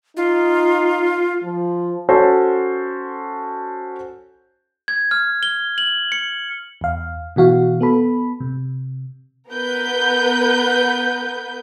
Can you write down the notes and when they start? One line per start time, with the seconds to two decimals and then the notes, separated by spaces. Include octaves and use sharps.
0.17 D#4 F4
1.43 F3
2.09 C#4 F#4 A4 C5
4.88 G#6
5.11 F6
5.43 G7
5.78 F#7
6.12 C#7
6.81 E2 F5
7.36 B2 E3 F#4 F5
7.81 B3 A4 B5
8.40 C3
9.50 B3 A#4 B4 G6